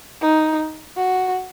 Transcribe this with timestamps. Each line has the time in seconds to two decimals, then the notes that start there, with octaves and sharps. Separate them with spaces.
0.22 D#4
0.96 F#4